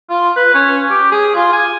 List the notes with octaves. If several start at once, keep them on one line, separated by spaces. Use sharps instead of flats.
F4
B4
C#4
G4
G#4
F4
G#5